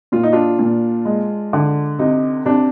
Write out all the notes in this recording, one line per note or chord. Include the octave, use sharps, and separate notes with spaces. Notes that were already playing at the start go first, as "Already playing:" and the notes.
A#2 F4
D#4
D4 F4
A#2
G#3
D3
C3 D#4
C3 D4